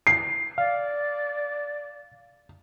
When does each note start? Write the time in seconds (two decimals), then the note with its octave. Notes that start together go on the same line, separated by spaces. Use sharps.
0.07 C7
0.58 D5 F5